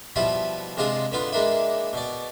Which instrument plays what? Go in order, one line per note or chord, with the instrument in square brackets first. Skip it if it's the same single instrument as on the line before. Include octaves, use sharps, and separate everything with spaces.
[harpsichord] B2 F3 G3 E4 F4
C3 G#3 D4 F4 G#4
D3 B3 F4
G#3 A#3 D4 E4
B2 D5